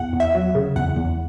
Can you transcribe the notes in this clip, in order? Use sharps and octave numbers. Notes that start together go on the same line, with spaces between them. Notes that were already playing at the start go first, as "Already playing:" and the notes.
Already playing: E2 F#5
E2
E5
F#3
C#3
E2 F#5
E2